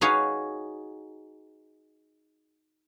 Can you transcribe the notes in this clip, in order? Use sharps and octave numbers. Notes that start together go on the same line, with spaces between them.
D#4 F#4 G#4 B4 C#5 F5